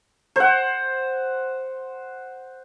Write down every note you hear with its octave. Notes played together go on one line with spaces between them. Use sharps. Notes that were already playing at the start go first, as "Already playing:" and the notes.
C5 F#5